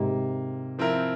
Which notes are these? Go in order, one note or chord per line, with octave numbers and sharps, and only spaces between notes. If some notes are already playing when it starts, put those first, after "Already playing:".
Already playing: G#2 C3 A#3
F3 C4 E4 A#4